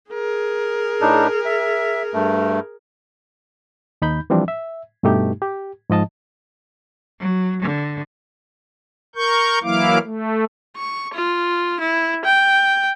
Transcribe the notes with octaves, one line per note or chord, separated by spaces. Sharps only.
G#4 A#4
A2 D4 D#4
E5
G2 A3
D#2 D#4 B5 G6
E3 F3 G3 C4 D4
E5
G2 B2 G3 A3 D#4 G4
G4
G#2 F3 D#5 A5
F#3
D3
A#4 C#6 G6
E3 F#3 A#3 E4 F5 D6
A3
C#6
F4
E4
G5